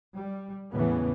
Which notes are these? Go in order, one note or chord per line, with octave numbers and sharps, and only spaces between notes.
G3
E2 A2 C#3 E3 B3